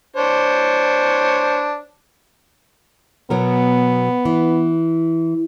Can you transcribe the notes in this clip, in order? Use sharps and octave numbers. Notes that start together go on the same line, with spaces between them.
D4 C5 C#5
B2 F#3 B3 A#4
E3